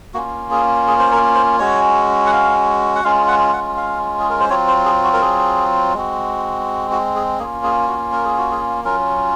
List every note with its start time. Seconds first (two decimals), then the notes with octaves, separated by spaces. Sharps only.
0.14 A#3 C#4 F4 F#4
0.51 G#4
0.87 G#4
0.99 C5
1.12 A#4
1.35 C5
1.59 G#3 C#4 F#4 C#5
2.26 F#5
2.32 F5
2.95 F#5
3.04 G#3 C#4 F4 F5
3.28 F#5
3.53 F#5
3.77 F5
4.20 G#4
4.30 A#4
4.40 C5
4.50 F#3 C4 F4 C#5
4.68 C5
4.86 G#4
5.04 F#4
5.13 A#4
5.22 G#4
5.94 G#3 C4 F#4
6.91 F#4
7.16 G#4
7.39 A#3 C#4 F4 G#4
7.64 G#4
7.87 F#4
8.12 A#4
8.25 G#4
8.38 F#4
8.51 G#4
8.84 F#3 C#4 F4 A#4